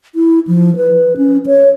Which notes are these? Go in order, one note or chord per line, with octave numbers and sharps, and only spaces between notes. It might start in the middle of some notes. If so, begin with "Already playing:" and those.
E4
F3
B4
C#4
C#5